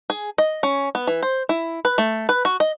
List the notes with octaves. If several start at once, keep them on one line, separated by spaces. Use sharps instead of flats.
G#4
D#5
C#4
B3
E3
C5
E4
B4
A3
B4
F#4
D#5